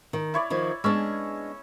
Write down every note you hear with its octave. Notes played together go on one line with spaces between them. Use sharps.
D#3
E4 C#5 D5
D#3 F3 D#4
G#3 B3 C#4 D4 C#6 E6